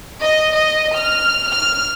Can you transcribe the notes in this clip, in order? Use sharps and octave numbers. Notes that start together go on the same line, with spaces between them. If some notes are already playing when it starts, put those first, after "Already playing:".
D#5
D#5
F6
F6